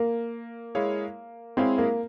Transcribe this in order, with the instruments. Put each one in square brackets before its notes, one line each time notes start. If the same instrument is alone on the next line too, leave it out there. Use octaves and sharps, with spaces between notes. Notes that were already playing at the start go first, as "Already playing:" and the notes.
Already playing: [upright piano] A#3
[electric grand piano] G#3 E4 G#4 C#5 F5
[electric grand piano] G#3 E4 G#4 C#5 F5 [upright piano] C4
[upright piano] A#3